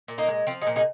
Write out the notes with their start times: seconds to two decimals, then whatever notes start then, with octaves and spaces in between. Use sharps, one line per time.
0.08 A#2
0.18 A#3 D#4
0.28 G#3
0.47 F3 C4 F4
0.62 D#4 G#4
0.67 A#2
0.76 D#4 G#4